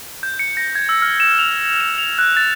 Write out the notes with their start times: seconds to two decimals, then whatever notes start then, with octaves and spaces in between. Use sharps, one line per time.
0.23 G6
0.39 C#7
0.57 A#6
0.75 G#6
0.89 E6
1.02 F6
1.20 E7
1.39 F7
1.81 E7
1.98 F7
2.18 F#6
2.37 A6